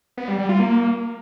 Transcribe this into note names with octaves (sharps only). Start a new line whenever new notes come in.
B3
G3
G3
F4
A#3